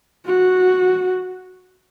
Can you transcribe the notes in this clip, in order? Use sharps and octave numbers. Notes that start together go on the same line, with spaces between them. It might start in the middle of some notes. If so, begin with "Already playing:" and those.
F#4